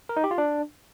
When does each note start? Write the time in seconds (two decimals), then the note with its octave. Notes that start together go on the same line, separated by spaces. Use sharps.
0.09 A#4
0.17 D#4
0.24 G4
0.31 F4
0.38 D4